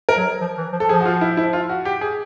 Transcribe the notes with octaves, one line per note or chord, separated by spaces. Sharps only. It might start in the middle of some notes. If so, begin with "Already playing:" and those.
A#4
F#3
F3
E3
F3
A4
F3 G#4
F#4
F4
E4
E4
F4
F#4
G4
G#4